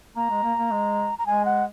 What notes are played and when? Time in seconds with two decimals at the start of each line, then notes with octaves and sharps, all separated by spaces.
0.16 A#3 A#5
0.30 G#3
0.43 A#3
0.58 A#3
0.71 G#3
1.19 A#5
1.26 G#3 G#5
1.45 F#5